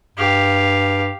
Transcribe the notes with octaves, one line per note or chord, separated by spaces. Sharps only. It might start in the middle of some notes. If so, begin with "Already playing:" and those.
G2 G4 F5